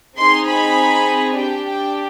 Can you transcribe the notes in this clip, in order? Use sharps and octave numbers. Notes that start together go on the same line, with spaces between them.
C4 D#4 G#4 C6
B5
D4 G4 G5
G5